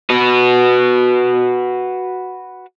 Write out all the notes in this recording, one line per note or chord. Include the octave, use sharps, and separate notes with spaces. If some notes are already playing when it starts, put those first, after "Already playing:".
F#4 B4